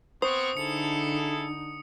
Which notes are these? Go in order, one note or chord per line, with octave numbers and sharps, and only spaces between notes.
B3 C4 C5 C#6 D#6
D3 D#4 E4 G#4 A4 C#7